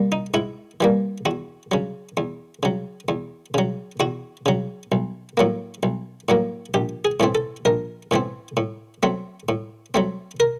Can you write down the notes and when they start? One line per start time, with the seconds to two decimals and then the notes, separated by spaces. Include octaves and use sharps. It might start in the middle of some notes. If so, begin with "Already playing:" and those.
Already playing: G3 A#3
0.12 D#4
0.34 G#2 E4
0.80 E3 G3 A#3
1.25 E2 F#4
1.71 C#3 F#3
2.17 E2
2.63 C#3 F#3
3.09 E2
3.54 C#3 F#3
4.00 E2 F#4
4.46 C#3 F#3
4.92 B1
5.37 A2 F#3 A#3
5.83 B1
6.29 A2 F#3 A#3
6.74 A#1 G4
7.05 G#4
7.20 A2 E3 A3 C4
7.35 A4
7.65 A#1 A#4
8.11 A2 E3 A3 C4
8.57 A2
9.03 F#3 A3 C4
9.49 A2
9.94 F#3 A3 C4
10.40 A#4